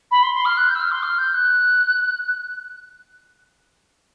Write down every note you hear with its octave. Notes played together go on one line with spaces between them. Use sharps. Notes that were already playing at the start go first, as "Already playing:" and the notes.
B5
C6
C6
F6
F#6
G6
E6
F6
C6
F6
G6
F#6